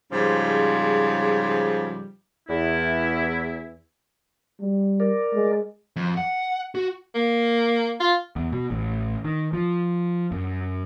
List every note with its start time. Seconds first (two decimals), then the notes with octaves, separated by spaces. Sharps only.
0.12 G#2 C#3 F3 G3
2.49 E2 E4
4.60 G3
5.00 A#4 D5
5.34 G#3
5.96 F2
6.17 F#5
6.75 F#4
7.15 A#3
8.00 F4
8.36 E2
8.52 B2
8.71 A1
9.24 D#3
9.53 F3
10.32 F#2